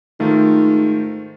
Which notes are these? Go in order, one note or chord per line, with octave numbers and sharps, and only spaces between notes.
G#2 D#3 A3 F4